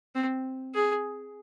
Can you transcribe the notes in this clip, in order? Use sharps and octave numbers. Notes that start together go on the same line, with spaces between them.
C4
G#4